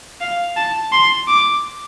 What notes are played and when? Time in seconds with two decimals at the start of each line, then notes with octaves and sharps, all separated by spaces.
0.21 F5
0.57 A5
0.92 C6
1.28 D6